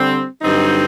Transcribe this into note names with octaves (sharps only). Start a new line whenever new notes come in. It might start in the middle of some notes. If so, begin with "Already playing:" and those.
Already playing: D3 G3 C4
G2 D3 F#3 C4 D#4